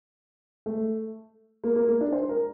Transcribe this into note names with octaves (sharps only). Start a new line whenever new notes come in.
A3
A#3
A#3
A#3
D4
C5
A#4